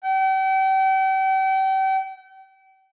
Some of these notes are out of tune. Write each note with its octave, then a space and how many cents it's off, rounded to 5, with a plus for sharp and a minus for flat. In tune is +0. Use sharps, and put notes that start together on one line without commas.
G5 -40